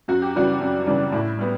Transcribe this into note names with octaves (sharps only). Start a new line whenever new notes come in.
F#2 F#4
G4
C#3 E3 G3 D4 F#4
F#2
C#3 E3 G3 D4
A2 E4
G3 B3